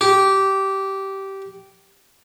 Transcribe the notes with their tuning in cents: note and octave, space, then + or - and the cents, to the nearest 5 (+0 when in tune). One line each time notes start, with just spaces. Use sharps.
G4 -15